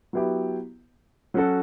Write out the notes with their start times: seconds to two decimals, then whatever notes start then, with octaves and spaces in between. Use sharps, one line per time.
0.13 F#3 B3 E4 G4
1.34 F#3 C#4 F#4 A4